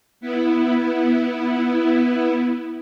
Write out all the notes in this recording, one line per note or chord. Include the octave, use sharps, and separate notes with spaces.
B3 E4